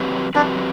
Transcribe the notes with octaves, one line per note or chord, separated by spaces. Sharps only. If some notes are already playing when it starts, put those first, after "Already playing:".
Already playing: F#3 C4 G4 B4
F#3 C4 D4 G4 B4